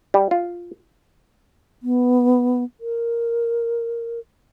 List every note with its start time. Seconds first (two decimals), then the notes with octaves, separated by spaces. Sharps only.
0.14 G3
0.31 F4
1.83 B3
2.80 A#4